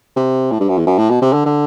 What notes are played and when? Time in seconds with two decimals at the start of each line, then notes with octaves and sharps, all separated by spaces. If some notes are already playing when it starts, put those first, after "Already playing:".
0.16 C3
0.51 A2
0.60 G2
0.69 F#2
0.77 E2
0.87 F#2
0.98 A2
1.10 B2
1.21 C3
1.33 D3
1.45 D3